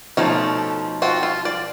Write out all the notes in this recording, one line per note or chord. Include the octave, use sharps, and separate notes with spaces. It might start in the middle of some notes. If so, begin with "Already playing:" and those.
B2 F3 A3 C#4 D#4
C4 F4 F#4
F4
D5